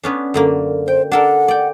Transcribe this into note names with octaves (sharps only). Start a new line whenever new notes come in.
B3 C#4 D4
F#2 D3 A#3
C5 G5
D4 A4 A#4 F#5
D5 G5